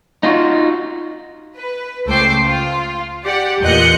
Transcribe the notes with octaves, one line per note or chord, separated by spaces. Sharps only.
D#4 F4 F#4
B4
C#2 A3 C5 G5 D6 C7
F4
G4 D5 F#5
E2 A#2 D#5 F#6 G6 C#7